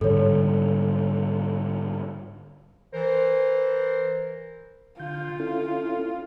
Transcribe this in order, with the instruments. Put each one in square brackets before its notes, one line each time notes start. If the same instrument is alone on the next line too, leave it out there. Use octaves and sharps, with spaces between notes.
[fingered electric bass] G#2 D3 G3 [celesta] A4 C#5
[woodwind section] E3 A#4 C5
[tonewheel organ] D3 G6 [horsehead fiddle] F4
[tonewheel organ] C#4 E4 A4